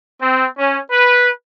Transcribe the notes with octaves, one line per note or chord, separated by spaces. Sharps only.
C4
C#4
B4